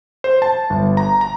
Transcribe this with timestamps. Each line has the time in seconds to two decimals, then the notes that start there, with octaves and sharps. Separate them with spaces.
0.24 C5
0.42 A5
0.70 G1
0.97 A#5
1.21 A#5